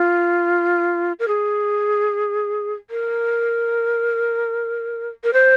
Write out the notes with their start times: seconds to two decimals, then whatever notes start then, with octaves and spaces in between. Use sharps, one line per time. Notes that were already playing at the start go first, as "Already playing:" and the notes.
Already playing: F4
1.19 A#4
1.28 G#4
2.90 A#4
5.24 A#4
5.33 C5